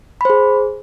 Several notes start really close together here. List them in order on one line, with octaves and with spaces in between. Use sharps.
B5 C5 G#4